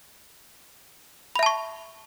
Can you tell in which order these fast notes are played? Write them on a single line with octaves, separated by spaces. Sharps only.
B5 E5 A5 C#6